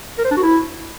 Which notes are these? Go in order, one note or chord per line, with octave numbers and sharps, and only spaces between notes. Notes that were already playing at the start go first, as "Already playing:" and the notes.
A#4
C5
D4
F#4
E4